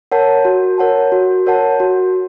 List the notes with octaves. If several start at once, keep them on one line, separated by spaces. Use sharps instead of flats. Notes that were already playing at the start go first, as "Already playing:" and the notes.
A#4 C#5 F#5 A5
F#4
A#4 C#5 F#5 A5
F#4
A#4 C#5 F#5 A5
F#4